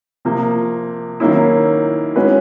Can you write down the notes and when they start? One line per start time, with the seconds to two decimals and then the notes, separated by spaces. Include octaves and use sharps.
0.25 C3 F3 A#3
1.20 D#3 F#3 A#3 C#4 E4
2.16 G#3 C#4 F#4 B4